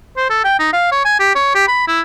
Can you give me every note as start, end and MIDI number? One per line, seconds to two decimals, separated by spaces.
0.17 0.27 72
0.30 0.42 69
0.44 0.59 79
0.59 0.69 63
0.73 0.87 77
0.92 1.01 73
1.05 1.15 80
1.20 1.34 67
1.35 1.54 73
1.55 1.68 67
1.68 1.86 83
1.87 2.01 64